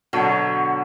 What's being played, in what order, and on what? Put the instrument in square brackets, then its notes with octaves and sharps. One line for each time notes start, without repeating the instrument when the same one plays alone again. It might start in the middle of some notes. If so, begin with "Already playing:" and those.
[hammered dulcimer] B2 D3 F#3